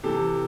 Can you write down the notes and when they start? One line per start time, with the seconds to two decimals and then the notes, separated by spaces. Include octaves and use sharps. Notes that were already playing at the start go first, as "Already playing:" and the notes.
0.03 C3 E3 G4 A4